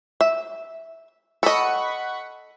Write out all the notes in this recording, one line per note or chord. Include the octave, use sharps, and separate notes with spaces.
E5
A4 D#5 F#5 B5 C#6